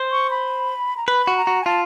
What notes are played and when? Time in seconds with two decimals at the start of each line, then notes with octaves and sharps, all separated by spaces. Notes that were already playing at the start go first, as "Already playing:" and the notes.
Already playing: C5
0.12 C#6
0.31 B5
0.97 A#5
1.07 B4 B5
1.27 F#4
1.37 A#5
1.47 F#4
1.62 G#5
1.66 F4 A5